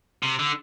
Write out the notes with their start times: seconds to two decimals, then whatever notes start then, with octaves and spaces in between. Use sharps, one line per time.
0.23 C3
0.39 D3